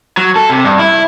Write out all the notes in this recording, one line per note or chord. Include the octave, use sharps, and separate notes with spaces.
F#3
A4
C3
G2
E4